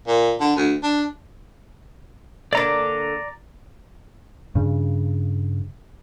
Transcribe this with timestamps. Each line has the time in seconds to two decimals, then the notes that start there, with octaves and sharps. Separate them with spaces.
0.07 A#2
0.40 D3
0.56 D2
0.83 D4
2.53 D3 A#3 D4 D5 A#5 D6
4.55 G2 C#3